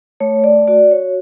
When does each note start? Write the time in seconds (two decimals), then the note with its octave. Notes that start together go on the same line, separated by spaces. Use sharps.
0.20 A3 C#5
0.44 D5
0.67 F#4 D5
0.91 C#5